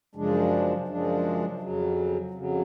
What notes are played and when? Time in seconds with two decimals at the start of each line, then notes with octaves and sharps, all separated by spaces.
0.15 F#2 C#3 F3 G#3 D4
0.87 F#2 C#3 F3 G#3 D4
1.60 F2 C#3 F#3
2.31 F2 C#3 F#3